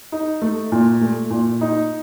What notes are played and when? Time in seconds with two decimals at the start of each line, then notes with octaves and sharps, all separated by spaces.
0.12 D#4
0.42 A3
0.72 A#2
1.01 A3
1.30 A#2
1.61 D#4